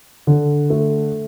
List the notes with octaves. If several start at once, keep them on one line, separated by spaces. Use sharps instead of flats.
D3
A3